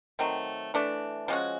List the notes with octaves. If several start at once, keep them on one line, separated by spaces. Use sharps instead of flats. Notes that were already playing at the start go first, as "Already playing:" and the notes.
D#3 F#3 A3 C4
E3 A3 D4
F3 G#3 C#4 F#4